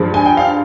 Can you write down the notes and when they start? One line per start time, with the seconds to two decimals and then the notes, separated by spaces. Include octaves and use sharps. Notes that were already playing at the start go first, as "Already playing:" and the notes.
Already playing: G2 F3 G#3
0.14 G#5
0.25 G5
0.37 F5